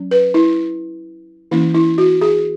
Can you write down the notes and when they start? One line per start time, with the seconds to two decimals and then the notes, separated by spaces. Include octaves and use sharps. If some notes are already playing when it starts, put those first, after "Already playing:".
Already playing: F#3 C#4
0.11 B4
0.34 E4
1.51 E3 A#3 C#4 E4
1.74 E4
1.98 F#4
2.22 G#4